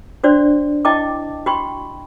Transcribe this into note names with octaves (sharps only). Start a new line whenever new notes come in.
D4 F#4 C5 D5
E4 D#5 G5 A5 D6
F#4 G5 B5 C#6